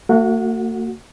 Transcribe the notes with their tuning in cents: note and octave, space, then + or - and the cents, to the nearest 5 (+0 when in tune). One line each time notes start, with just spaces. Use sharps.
A3 +45 F#4 +0 F#5 -30